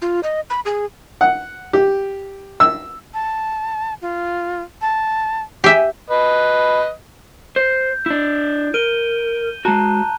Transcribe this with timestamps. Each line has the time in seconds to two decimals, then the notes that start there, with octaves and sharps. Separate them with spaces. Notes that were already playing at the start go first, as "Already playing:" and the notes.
0.02 F4
0.23 D#5
0.50 B5
0.65 G#4
1.21 F#5
1.73 G4
2.60 E6
3.14 A5
4.02 F4
4.81 A5
5.64 G4 E5 G#5
6.10 B4 D#5
7.56 C5 G6
8.06 D4 E4
8.74 A#4 D#7 G7
9.65 G#3 F#4 A5 A#5 F#6